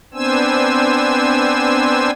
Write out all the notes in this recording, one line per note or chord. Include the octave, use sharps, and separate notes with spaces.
B3 C4 D4 C5 G#5 E6